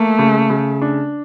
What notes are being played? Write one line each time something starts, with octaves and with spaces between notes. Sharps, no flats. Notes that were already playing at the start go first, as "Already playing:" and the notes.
Already playing: A3 A#3
C#3
C#3
D4